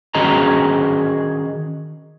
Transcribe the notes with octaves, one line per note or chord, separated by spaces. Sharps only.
D#3 C#4 F#4 G#4 D#5 A#5